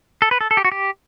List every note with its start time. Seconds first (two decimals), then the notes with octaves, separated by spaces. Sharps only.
0.22 A4
0.31 B4
0.41 A4
0.51 A4
0.57 G4
0.65 F#4
0.72 G4